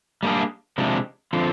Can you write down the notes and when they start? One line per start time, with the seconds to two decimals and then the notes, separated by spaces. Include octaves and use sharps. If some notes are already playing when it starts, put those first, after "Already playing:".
0.23 G3 A#3 D4 G#4
0.78 C3 F3 G#3 D4
1.33 D3 F3 C4 F4